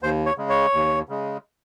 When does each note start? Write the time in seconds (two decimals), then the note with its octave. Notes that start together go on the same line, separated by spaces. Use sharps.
0.02 D#2 C5
0.26 C#5
0.38 C#3 G#3
0.50 C#5
0.74 D#2
1.09 C#3 G#3